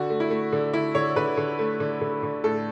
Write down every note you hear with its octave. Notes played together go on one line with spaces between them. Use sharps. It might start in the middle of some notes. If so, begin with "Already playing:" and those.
Already playing: D3 F#4
A3
E4
A3
D3
D3 E4
D3 C#5
D3 B4
D3
A3
D3
D3
D3
A2 A4